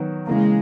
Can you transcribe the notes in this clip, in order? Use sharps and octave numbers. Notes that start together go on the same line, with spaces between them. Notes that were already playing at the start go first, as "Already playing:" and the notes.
Already playing: D#3 F#3 B3 F#4
C#3 E3 G#3 A#3